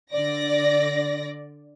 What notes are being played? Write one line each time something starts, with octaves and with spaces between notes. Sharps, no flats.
D3 D5 A#6